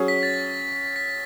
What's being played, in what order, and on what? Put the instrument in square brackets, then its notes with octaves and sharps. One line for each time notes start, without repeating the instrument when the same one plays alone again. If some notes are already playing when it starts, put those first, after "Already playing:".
Already playing: [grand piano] F#3 C#4 G#4
[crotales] B6
A6
B6